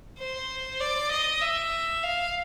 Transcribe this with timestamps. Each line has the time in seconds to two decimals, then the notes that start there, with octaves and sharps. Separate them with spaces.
0.19 C5
0.80 D5
1.11 D#5
1.42 E5
2.03 F5